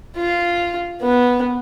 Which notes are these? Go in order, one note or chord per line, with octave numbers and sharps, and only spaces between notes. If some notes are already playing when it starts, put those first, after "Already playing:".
F4
B3